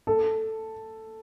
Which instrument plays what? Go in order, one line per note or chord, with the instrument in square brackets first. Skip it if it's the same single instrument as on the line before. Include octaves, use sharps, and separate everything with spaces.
[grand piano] A4